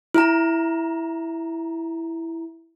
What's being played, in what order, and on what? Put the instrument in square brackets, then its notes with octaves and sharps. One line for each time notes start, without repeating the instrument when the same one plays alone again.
[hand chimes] E4 A#5